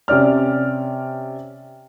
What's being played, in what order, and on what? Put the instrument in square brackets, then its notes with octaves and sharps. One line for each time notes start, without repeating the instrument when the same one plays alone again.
[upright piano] C3 C#4 D5 F6